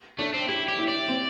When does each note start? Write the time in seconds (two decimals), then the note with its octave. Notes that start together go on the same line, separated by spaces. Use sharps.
0.19 A3 D4
0.34 C4
0.48 E4 G4
0.68 G4
0.79 E4
0.88 D5
1.08 C4